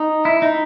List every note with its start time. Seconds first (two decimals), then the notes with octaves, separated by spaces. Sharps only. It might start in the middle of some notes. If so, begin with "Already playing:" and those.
Already playing: D#4
0.25 E4
0.42 D#4